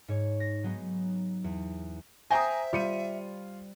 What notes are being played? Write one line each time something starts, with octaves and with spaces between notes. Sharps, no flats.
G#2 C#5
A#6
F#3 G#3 B3 D#4
E2
C5 E5 G5 G#5 A#5 D#6 A#6
G3 F4 C#7 D#7